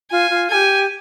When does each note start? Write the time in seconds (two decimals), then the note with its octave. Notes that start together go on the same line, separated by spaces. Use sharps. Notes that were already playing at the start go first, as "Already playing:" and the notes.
0.11 F4 G#5
0.31 F4
0.50 A4 G#5
0.54 G4